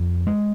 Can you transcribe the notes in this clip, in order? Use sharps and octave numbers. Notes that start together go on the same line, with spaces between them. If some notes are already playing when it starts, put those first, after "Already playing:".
Already playing: F2
G#3